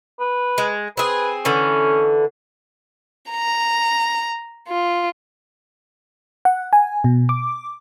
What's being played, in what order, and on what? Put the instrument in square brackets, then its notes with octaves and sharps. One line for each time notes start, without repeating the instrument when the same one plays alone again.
[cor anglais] B4
[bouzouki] G#3
[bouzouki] C4 G#4 [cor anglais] B4
[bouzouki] D3 E3 [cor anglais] C#4
[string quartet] A#5
F4
[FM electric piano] F#5
G#5
B2
D6